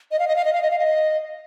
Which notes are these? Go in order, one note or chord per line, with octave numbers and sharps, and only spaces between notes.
D#5
F5
D#5
F5
D#5
F5
D#5
F5
D#5